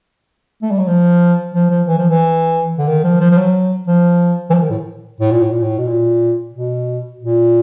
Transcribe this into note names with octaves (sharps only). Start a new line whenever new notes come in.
A3
G3
F#3
F3
F3
F3
E3
F3
E3
D3
D#3
F3
F3
F3
F#3
F3
E3
F3
D#3
A2
A2
A#2
A2
A#2
A2
B2
A#2
B2
A#2